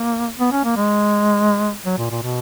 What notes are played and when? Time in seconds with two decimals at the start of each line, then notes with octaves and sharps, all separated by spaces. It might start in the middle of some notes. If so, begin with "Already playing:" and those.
Already playing: A#3
0.40 B3
0.52 C#4
0.64 A#3
0.76 G#3
1.86 F#3
1.98 A#2
2.10 A#2
2.22 B2